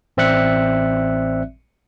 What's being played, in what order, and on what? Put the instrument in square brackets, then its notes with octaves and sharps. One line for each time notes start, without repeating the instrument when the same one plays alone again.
[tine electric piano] A1 C4 D5 E5 F#6 C#7